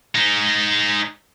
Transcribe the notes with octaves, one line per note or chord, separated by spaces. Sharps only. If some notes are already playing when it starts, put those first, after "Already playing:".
G#3 D#4